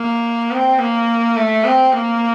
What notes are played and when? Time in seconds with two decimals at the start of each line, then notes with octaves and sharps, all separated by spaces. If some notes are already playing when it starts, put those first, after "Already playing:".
Already playing: A#3
0.51 C4
0.79 A#3
1.36 A3
1.64 C4
1.92 A#3